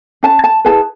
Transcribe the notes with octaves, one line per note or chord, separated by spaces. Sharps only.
C#4 A5
A5
E4 G#4 B4 A5